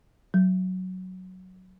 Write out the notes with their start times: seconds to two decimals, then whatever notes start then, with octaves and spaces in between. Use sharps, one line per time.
0.34 F#3